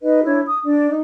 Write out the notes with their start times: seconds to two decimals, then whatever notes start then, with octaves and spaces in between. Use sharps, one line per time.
0.02 D#4 B4 D#5
0.24 D4 E4 C#5
0.46 D#6
0.64 D4 D5
0.90 D#4